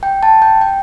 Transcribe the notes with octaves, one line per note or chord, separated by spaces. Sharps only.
G5
A5
G5
G5